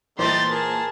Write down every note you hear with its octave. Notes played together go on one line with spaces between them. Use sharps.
A#2 E3 G3 A3 D#4 C5 C6 A6
G#4 A#4 A5